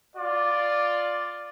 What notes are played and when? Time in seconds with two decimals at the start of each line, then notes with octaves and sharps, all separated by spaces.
0.16 F4 D5